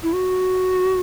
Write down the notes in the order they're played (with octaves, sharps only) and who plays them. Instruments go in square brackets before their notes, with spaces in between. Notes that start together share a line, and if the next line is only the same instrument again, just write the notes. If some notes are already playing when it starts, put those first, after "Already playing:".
[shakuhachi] E4
F#4